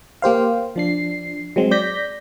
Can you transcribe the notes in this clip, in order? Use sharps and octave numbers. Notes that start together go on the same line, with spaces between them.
A#3 G4 C5 F5
F3 D4 C7
F#3 G#3 C4
D5 G6 A#6 B6